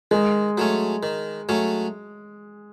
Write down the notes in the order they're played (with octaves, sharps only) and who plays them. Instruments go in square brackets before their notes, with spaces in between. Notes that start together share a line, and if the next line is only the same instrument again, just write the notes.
[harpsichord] D#3 [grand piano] G#3
[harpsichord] F#3 A3 C#4
D#3
F#3 A3 C#4